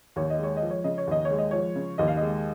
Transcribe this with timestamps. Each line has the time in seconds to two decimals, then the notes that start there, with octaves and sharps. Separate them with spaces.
0.16 D#2 C#5
0.30 D#5
0.39 G#3 C#5
0.57 D#5
0.62 F3
0.71 C#5
0.84 C#3 D#5
0.98 C#5
1.07 D#2 D#5
1.25 C#5
1.30 G#3
1.38 D#5
1.51 F3 C#5
1.76 C#3
1.98 D#2 D#5
2.08 F5
2.17 G#3 D#5